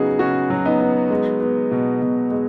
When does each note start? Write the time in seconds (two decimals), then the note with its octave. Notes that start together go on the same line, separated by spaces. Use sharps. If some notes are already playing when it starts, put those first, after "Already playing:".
Already playing: C#3 F#3 B3 D#4 F#4 G#4
0.19 C#3 C#4 F#4
0.50 F#3
0.65 B3 D#4
0.81 B3
1.10 G#3
1.41 B3
1.71 B2
2.02 B2
2.31 G#3